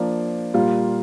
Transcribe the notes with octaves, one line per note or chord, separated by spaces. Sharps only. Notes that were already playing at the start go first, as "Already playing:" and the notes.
Already playing: F3 A#3 D4
A#2 G3 A#3 F4